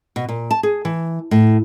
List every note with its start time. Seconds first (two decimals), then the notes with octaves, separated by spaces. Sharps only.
0.16 B2
0.29 A#2
0.51 A5
0.63 G#4
0.85 E3
1.31 A2